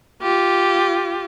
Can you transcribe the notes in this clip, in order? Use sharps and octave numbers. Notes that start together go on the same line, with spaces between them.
F4 G4